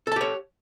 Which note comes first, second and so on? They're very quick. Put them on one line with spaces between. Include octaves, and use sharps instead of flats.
A4 A5 G4 C#5